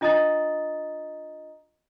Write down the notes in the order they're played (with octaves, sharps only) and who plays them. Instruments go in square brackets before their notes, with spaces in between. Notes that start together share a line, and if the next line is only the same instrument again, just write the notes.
[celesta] D4 F4 D#5 A#5 D#6 A6